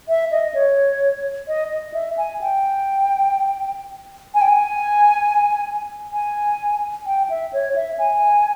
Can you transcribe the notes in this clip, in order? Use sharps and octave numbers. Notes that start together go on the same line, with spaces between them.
E5
D#5
C#5
D#5
D#5
E5
G#5
G5
G#5
G5
G#5
G#5
G5
E5
C#5
E5
G#5